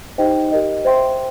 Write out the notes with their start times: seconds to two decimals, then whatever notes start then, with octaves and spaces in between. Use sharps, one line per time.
0.18 D#4 G4 C5 D#5 G5
0.52 G4 A#4 D#5
0.85 C5 E5 G5 C6